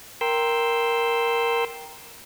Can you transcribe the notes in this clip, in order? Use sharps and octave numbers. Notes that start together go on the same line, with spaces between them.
A#4 G5 C6 E6